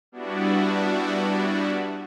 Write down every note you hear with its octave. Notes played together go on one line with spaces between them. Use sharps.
G3 B3 D4 E4 F#4